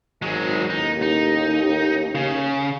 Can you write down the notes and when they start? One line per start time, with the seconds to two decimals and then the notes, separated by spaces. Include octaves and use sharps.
0.22 G#1 F#3 G#3
0.70 A1 D#2 D#4
1.02 D#4
2.15 C#3